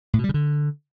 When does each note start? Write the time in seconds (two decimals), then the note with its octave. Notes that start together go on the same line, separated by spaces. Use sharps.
0.13 A2
0.19 B2
0.24 G3
0.29 C#3
0.34 D3